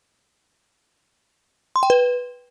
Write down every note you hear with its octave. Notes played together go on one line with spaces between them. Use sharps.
C6
G5
B4